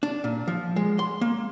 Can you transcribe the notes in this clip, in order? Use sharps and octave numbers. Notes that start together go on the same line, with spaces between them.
D4
A#2
F3
G#3
C6
A#3